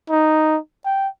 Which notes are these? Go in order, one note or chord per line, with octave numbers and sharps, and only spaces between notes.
D#4
G5